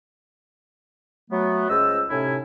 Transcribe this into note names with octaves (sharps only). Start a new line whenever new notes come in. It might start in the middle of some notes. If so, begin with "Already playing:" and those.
F#3 A3 B3
C#2 F4 C5 D#5 E6
A2 C3 C#4 D#4 E4 G#5